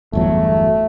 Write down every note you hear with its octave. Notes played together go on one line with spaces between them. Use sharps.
G1 E2 F#3 A3